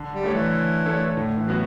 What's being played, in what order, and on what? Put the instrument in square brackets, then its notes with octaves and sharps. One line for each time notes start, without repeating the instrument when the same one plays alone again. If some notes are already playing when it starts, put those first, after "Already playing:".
Already playing: [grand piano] D3
[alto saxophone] G3
[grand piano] A3 D4 A4 C#5
[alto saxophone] E3
[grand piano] D3
A3 D4 A4 C#5
[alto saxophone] E3
[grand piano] A2 [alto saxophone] D3
[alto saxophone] E3
[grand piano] F#3 B3 F#4